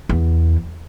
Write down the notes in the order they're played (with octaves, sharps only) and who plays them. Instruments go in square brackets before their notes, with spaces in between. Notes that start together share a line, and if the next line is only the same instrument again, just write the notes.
[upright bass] E2